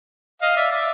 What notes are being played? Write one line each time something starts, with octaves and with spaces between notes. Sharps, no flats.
D#5 F5
D5 E5
D5 E5